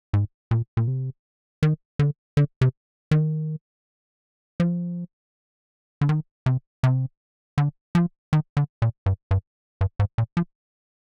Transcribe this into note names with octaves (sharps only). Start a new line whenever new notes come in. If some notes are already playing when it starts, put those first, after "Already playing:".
G#2
A#2
A#2
C3
D#3
D3
D3
C3
D#3
F3
D3
D#3
C3
C3
D3
F3
D#3
D3
A#2
G2
G2
G2
G#2
A#2
F3